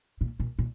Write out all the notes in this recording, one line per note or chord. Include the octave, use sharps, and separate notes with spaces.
A#2
A#2
A#2